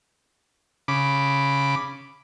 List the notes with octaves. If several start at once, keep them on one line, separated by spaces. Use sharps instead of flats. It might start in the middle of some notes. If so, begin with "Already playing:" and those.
C#3 B5 D6